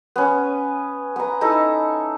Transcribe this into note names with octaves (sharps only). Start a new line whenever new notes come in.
B3 C#4
B3 A#5
D#4 E4 A4 A#5